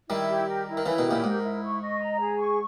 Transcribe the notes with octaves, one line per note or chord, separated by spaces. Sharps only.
D#3 G3 E4
G4
A#4
E4
D#3
C#3 E3 E4
B2 D#3
G4
A#2 C#3
G#2 A#4
E4
C#6
D#5
A#5
G#4
C#6